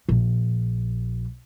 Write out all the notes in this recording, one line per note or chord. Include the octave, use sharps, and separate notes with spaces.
A#1